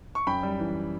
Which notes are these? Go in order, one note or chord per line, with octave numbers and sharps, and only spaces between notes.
C#6
F#2 G5 B5
G3
E3